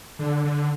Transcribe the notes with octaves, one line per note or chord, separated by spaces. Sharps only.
D3
D3